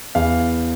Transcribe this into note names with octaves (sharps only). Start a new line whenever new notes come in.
E2 F5